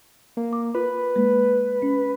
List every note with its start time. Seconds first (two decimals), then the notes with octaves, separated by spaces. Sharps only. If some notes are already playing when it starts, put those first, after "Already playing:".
0.37 A#3
0.53 D6
0.75 F4 A#4 B4
1.16 G#3 A#3
1.82 C#4